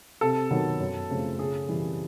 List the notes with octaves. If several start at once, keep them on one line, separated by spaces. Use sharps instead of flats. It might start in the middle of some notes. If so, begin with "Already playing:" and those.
C3 A4
D#3 F#3 B3
F#2
C#3 F3 A3 C4
C#3 G#4
E3 G3